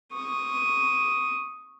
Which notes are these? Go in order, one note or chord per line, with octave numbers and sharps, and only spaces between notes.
C#6 D#6